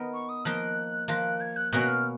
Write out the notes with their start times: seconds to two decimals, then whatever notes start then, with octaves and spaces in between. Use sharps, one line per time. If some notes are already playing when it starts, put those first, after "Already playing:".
Already playing: B3 D#4 A#4
0.14 C#6
0.29 D#6
0.45 F3 A#3 D#4 A#4 F#6
1.08 F3 A#3 F4 A#4 F#6
1.41 G#6
1.56 F#6
1.72 B2 A#3 C#4 F#4 F#6
1.88 F6